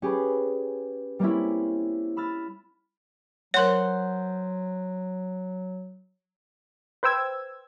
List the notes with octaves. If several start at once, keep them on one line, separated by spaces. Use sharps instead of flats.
C#4 G4 G#4 B4
G3 A#3 C4 C#4 E4
B5 E6 F6 A6
F#3 A#4 C5 C#5 F#5
B4 C5 G5 E6 G#6